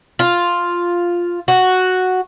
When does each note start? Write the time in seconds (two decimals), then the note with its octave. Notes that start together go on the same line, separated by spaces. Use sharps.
0.19 F4
1.48 F#4